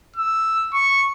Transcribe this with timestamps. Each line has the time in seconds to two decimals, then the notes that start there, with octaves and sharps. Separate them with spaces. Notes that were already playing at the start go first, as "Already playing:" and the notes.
0.16 E6
0.73 C#6